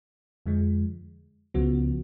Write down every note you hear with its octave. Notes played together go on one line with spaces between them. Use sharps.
F2 D3 F3 G#3
C#2 C#3 F3 B3 F#4